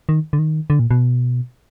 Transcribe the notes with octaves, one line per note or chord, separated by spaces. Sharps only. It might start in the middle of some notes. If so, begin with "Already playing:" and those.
D#3
D3
D#3
D3
A#2
B2